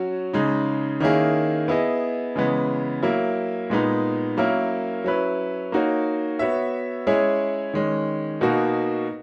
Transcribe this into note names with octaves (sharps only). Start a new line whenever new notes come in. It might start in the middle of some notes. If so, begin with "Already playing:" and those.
Already playing: F#3 C#4 F#4
C#3 G#3 D#4
D#3 A#3 C#4 E4 G#4
B3 E4 G#4 D#5
C#3 E3 G#3 B3
F#3 A#3 E4
A#2 G#3 B3 D#4
F#3 A#3 C#4 E4 A#4
F#3 C#4 E4 B4
A#3 D#4 F#4 C#5
B3 F#4 C#5 E5
G#3 C#4 E4 G#4 C#5
D#3 G#3 C#4
B2 A#3 D#4 F#4